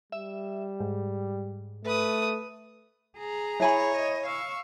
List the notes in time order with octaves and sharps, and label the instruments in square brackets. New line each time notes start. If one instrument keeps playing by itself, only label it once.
[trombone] G3 [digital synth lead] E5
[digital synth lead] G#2
[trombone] A3 [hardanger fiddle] B4 D#6
[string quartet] G#4 A#5
[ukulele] E4 G#5 B5 [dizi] C#5
[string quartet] D#5
F5 C#6 E6